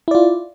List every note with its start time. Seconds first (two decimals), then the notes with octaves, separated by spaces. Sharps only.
0.08 E4
0.11 D5
0.15 F4